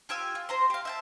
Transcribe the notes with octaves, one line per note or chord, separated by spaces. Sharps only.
F4 G4 G#5 E6
F4
C5 A#5 C6
G4 F5
E5 G5 A5